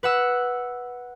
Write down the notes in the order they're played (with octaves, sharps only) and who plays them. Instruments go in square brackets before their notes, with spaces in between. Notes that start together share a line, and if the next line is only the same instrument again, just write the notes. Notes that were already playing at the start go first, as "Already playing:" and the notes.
[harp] B4 F#5 E6